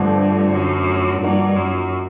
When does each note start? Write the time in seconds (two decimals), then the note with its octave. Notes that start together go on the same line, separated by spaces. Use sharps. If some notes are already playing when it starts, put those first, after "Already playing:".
Already playing: G2 D3 F3 A3 C4
0.54 F#2
1.21 G2 F3 A#3 D#4 F#4 A#4
1.56 F#2